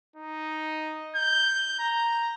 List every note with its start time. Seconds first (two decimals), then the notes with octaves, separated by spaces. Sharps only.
0.16 D#4
1.16 G6
1.79 A#5